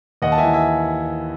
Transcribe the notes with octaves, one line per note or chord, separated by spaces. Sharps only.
D#2 D#5 F#5
A5
E5 G#5
E3
E5 G#5